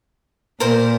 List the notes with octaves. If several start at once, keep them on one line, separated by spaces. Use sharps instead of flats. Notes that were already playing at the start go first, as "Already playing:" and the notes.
A#2 A#4 C5